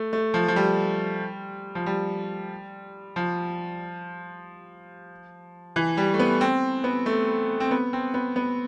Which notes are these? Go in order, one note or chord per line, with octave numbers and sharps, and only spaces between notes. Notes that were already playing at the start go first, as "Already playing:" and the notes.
Already playing: A3
A3
F3
F3
G3
F3
G3
F3
E3
G3
A3
B3
C4
B3
A3
C4
B3
C4
B3
B3